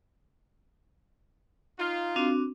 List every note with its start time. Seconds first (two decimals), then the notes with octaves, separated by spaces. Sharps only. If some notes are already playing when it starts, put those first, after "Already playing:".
1.79 D#4 F4
2.16 C4 D4 F#4